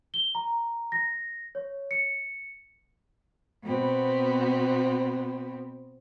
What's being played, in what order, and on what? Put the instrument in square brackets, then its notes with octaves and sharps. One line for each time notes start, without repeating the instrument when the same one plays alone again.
[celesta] G7
A#5
A#6
C#5
C#7
[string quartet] B2 B3 C4